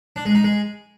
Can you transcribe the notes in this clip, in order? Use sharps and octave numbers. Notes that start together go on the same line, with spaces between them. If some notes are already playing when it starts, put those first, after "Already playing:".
D4
G#3
D#4
G#3